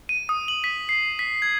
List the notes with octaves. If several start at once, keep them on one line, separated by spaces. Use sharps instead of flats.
D#7
D#6
F#7
B6
C7
B6
G#6